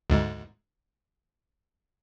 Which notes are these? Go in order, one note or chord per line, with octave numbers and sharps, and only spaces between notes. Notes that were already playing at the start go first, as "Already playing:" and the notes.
D2 G#2